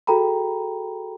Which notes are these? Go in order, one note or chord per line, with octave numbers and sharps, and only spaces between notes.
F#4 G#4 A4 G5 A#5 B5